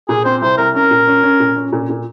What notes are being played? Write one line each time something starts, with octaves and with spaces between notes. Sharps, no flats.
A#2 G#4
C4 C5
C2 C5
C2 A#4
C#4 A#4
A#2
C#4
C#4
A#2
C#4
A#2
A#2